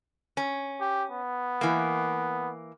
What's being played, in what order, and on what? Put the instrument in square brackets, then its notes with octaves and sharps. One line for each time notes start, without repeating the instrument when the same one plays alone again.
[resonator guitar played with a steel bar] C#4
[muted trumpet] G4
B3
[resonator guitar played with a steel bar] E3 A#3